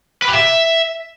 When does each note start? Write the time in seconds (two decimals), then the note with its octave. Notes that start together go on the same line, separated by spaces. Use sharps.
0.22 B4
0.28 G4
0.33 E5